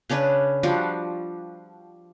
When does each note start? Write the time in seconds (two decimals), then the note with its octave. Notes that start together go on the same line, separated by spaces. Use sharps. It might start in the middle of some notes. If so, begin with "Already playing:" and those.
0.10 C#3 C#4 D4 B4
0.63 F3 G3 D4 F#4